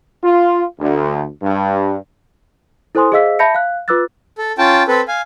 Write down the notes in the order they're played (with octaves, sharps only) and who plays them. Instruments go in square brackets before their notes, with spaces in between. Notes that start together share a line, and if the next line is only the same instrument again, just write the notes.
[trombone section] F4
D2
G2
[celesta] E4 A4 C5 G#5 C6 D#6
G#4 C5 D#5 F5 E6 B6
E5 A5 B5 G6 A#6 C#7
F5 F#6
F4 B4 D6 E6 F#6 A6
[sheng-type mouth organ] A4
C#4 F4 G5 A5
C4 A4 B4
F5 G#5